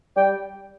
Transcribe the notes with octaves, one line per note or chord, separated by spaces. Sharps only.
G3 D5 G5